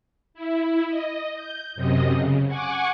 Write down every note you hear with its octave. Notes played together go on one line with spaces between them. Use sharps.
E4
D#5
G6
F#2 C3 D#5
C#3
F#5 G#5 C#6 D6